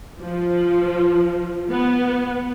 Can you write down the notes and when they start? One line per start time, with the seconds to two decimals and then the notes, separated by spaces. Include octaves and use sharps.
0.20 F3
1.69 B3